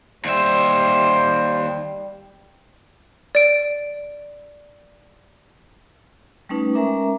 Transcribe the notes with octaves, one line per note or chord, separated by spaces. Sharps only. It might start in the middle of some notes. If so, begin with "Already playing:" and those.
D#2 G3 C5 E5
D5 D7
G3 A3 C#4 D#4 B4
G#3 C#4 A#4 E5 A#5 D6